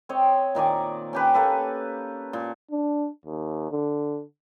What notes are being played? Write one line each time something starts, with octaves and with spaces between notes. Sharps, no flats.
C4 C#5 D#5
A#2 D#3 D5 G#5
C#4 G4 B4
A#3 A4 B4
A#2
D4
D#2
D3